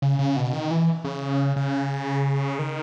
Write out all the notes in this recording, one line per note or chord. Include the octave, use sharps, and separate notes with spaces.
C#3
C#3
B2
D#3
E3
C#3
C#3
D#3